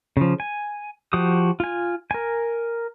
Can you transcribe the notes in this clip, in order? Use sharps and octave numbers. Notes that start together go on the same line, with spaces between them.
C#3 F3
G#5
F3 F#4 G4 D#6
F4 G#5
A#4 G#5